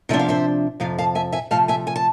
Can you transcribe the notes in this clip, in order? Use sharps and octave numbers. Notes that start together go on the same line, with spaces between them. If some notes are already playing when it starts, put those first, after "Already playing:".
C3 F3 B3 D4 E5
F5
C5 E5
F2 C3 F3 F5
F5 A5
E5 G#5
E5 G#5
C3 F3 A3 F5 A5
E5 G#5
G#5
A5